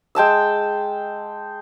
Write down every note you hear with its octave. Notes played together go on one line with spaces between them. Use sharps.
G#3 G5 A5 E6